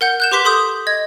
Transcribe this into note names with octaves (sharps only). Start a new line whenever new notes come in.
A#4 F#5 G6
F#6 G6 E7
G4 B4 C6 D6 B6 G7
A4 C6 D#6 G6
D#5 G#6